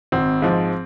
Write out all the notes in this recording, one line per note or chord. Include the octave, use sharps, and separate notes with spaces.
G#1 C4
G#2 F3